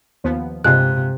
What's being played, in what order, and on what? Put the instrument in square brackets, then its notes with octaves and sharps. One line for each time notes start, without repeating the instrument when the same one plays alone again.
[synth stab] D#2 F3 B3
[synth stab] G2 G#3 F4 [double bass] C3 [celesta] F#6